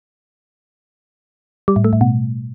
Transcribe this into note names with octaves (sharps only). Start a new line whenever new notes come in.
G3
A2
A3
A2
B2